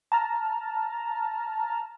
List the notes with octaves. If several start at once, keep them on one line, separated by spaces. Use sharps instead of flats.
A5 A#5 F6